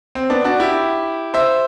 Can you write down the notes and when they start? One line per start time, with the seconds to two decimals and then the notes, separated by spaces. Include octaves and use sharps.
0.15 C4
0.30 B3 D4
0.44 D4 F#4
0.60 E4 G4
1.34 C5 E5